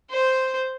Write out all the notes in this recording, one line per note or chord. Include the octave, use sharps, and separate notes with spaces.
C5